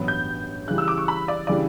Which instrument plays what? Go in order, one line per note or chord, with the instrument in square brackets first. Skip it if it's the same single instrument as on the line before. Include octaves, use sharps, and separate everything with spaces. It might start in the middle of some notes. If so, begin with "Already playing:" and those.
Already playing: [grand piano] A1 G2 F#3 B3
[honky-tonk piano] G6
[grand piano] C#3 E3 G3 [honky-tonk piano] F#6
[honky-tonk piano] E6
D6
C#6
B5
D5
[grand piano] C#3 E3 G3 D4 [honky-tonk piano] D5